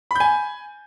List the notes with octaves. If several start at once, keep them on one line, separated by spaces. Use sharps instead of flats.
G#5 B5 G6